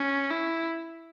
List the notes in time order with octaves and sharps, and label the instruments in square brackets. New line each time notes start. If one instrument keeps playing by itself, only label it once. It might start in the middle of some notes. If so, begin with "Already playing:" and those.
Already playing: [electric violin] C#4
E4